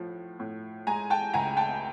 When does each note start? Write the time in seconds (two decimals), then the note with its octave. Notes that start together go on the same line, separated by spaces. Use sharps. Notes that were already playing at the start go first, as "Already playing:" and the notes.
Already playing: A2 F3
0.40 A2
0.87 G#3 G#5 A#5
1.10 G5 A5
1.33 C#2 G#5 A#5
1.57 G5 A5